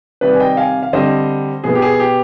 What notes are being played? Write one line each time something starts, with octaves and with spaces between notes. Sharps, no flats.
C3 D#3 G3 B4 D5
G#5
D#5 G5
F5 G#5
F5
D3 G3 C4 C5 D#5
B2 B3 G#4
G4
G#4
G4